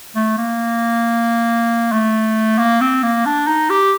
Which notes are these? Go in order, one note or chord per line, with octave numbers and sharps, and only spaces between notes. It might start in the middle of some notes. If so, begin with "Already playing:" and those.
A3
A#3
A3
A#3
C4
A#3
D4
D#4
G4